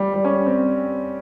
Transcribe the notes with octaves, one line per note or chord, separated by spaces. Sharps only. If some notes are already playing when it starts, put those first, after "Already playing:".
Already playing: G3
G3
C#4
C4